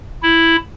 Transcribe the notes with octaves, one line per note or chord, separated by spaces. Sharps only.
E4